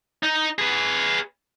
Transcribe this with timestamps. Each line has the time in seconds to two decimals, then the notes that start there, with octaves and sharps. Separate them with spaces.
0.23 D#4
0.59 G#4 B4